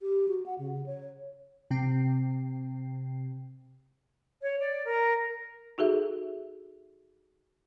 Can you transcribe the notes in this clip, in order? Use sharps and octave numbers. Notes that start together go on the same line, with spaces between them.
G4
F#4
F#5
C#3
C#5
C3 C4 G5 C7
C#5
D5
A#4
D#4 F#4 G#4 A4 E5